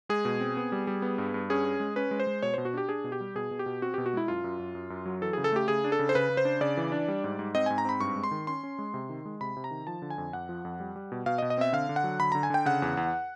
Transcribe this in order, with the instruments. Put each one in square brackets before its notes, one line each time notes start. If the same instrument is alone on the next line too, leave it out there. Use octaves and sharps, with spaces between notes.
[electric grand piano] G#3 G#4
B2
C4
B3
G3
G3
B3
G2
G2
C#4 G#4
C#4
G#3
C#4 B4
G#3
C5
G#3
B2 C#5
B2 C5
F#4
D4 G4
D4 G#4
B2
G4
G3
B2 G#4
B2
G4
B2
C4 F#4
B2 G4
F#4
G#3 E4
F#2 F4
F#2
F#2
F#2
F#2
F#3
E3 A4
C#3 G#4
A4
A3 G4
C#3 G#4
D4
A4
C#3
C5
C#3 B4
C#3
C5
D4
C#3 D5
E3
D4
G3
G#2
G#2
C4 D#5
G#2 G#5
A#5
C4 B5
G2 C#6
G#3
C6
D#3
C#4 C6
C#4
G#3
C3
D#3
G#3
C3 B5
C3
A#5
D#3
F3 A5
D3
G#5
F2
F2 F#5
F3
F2
G3
G3
B2
B2 F5
D#5
B2
D#5
C4 E5
D3 F5
D3
F#5
F#3
D3 B5
D3 A#5
G#5
D3 G5
C#3 F#5
E2
E2